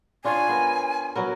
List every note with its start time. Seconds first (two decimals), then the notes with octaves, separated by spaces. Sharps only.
0.25 D4 F4 C#5 G#5
0.49 B3 A#4
1.16 F#3 B3 A#4